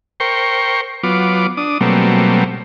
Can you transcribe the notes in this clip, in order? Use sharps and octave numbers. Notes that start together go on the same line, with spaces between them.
A#4 C5 G5 C#6
F#3 B3 F4 D6
D4 D#6
B2 F#3 G3 A3 A#3 C4